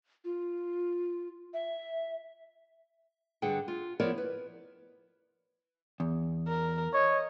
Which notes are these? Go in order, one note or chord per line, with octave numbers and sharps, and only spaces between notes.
F4
E5
G2 D3 G#4 F#5 G5
F4
F3 B3 E4 A#4 C#5 D5
B4
E2
A#4
C#5 D#5